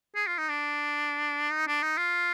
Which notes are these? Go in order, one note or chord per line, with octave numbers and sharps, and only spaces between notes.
G#4
F4
D#4
D4
D#4
D4
D#4
F4